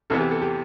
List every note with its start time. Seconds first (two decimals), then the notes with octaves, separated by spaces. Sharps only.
0.10 E2 C3 E3 B3 A4
0.20 G4
0.31 A4
0.42 G4